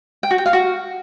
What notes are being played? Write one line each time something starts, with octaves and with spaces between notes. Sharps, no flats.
G5
F#4
G5
F5
F#4